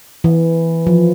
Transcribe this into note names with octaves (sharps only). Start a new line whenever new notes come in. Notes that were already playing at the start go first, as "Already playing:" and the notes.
E3
F3